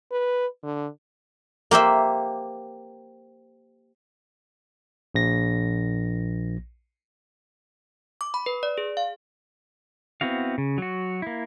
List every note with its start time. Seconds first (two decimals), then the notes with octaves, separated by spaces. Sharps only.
0.12 B4
0.63 D3
1.71 A#3 G4 C5 E5
5.15 A#1 A#6
8.21 D6
8.34 B5
8.46 B4
8.63 D5
8.78 G#4
8.97 F5
10.21 B3 C4 E4 F#4 F5
10.58 C#3
10.78 F#3 F#4
11.22 A#3 E4